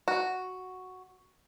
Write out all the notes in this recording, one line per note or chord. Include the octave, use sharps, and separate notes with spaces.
F#4